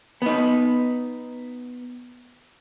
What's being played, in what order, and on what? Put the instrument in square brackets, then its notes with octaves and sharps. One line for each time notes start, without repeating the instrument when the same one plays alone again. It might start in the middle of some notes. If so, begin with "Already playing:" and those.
[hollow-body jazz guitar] B3 D#4